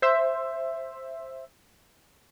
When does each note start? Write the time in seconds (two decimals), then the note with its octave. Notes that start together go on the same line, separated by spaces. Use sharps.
0.02 C5 E5